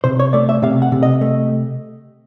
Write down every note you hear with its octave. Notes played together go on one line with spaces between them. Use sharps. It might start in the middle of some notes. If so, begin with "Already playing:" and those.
C3 C5
C#5
A3 D5
E5
C3 F5
F#5
C3
D#5
A3